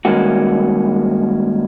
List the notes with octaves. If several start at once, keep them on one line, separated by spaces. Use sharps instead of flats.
G2 D#3 G#3 A#3 C#4 F#4